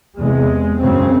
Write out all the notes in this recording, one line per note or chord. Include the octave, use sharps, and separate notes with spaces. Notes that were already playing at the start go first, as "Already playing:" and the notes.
E2 C3 G#3
F#2 C#3 C4